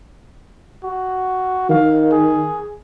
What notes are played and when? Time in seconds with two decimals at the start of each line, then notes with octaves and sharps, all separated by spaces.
0.84 F#4
1.70 D#3 F5
2.12 G#4